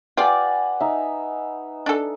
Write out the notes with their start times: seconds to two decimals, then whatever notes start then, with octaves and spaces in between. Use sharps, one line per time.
0.17 F4 G4 B4 D5 F#5 G#5
0.80 D#4 E5
1.86 D4 A4